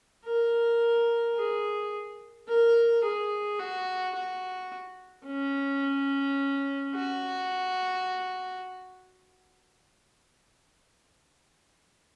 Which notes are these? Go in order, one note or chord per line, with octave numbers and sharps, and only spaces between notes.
A#4
G#4
A#4
G#4
F#4
F#4
C#4
F#4